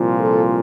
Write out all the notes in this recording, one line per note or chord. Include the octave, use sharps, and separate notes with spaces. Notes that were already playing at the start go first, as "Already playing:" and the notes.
Already playing: C2 A#2 F3
A4